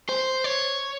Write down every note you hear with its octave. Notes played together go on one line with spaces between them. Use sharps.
C5
C#5